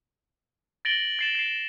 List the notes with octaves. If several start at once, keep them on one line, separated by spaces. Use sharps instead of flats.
A6 A#6 D7 F#7 G7
A6 C7 E7
A6 C7